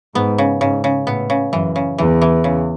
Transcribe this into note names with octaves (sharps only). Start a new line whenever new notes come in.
G#2 B3
C#3
G#2 C#3
C#3
A2 B3
C#3
F#2 E3
C#3
E2 E3
E3
C#3